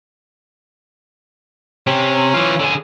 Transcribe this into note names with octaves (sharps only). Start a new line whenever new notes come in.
C3 C#4
E3 F4
D3 G#4